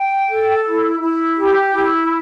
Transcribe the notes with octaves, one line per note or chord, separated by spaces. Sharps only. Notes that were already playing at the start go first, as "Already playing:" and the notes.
Already playing: G5
A4
E4
E4
G4
E4